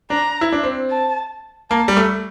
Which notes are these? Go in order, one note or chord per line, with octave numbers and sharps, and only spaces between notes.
D4 A#5
E4
D4
C4
A5
A#3 A5
G3
A3